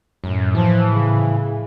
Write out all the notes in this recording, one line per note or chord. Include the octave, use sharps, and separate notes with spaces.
F#2 A2
E3 F3
C#3